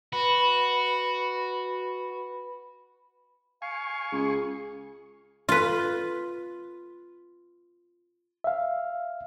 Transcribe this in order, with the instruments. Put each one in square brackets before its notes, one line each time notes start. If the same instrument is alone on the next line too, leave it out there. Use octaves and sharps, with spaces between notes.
[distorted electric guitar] F#4 [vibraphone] B4 B5
[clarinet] F5 [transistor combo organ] G#5 C#6
[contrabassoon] C#2 [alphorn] G#4
[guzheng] F4 B4
[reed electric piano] E5 F5